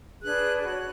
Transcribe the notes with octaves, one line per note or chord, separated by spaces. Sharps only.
D4 G#4 B4 F#6
F#4 C#5 F#6